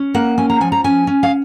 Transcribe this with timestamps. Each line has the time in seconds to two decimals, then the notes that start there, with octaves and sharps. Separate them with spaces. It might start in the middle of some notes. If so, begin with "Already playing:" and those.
Already playing: C#4
0.14 A#3 F#5
0.38 C#4 G#5
0.50 A#5
0.61 F3 G#5
0.72 A#5
0.84 C#4 G#5
1.07 C#4
1.23 F5